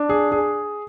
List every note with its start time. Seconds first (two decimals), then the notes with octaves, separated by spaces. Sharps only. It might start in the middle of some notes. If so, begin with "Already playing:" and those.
Already playing: D4
0.09 G#4
0.32 G#4